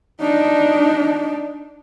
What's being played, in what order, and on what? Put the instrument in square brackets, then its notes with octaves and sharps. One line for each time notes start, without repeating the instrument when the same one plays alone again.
[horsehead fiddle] D4 D#4